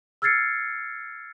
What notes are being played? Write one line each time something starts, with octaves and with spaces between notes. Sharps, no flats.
E6 F6 G#6 A6 C7 C#7